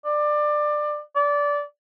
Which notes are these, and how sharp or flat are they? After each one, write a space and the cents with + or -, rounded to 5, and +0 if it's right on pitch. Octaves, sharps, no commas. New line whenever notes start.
D5 +20
D5 -20